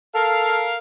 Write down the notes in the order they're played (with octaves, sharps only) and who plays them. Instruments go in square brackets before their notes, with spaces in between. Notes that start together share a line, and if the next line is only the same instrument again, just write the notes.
[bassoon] A4 [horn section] A#4 F5